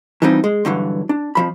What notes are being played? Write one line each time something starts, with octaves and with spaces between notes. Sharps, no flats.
E3 F3 G3 C4 D#4
G#3
G2 D3 E3 F#3
D4
F2 F3 B5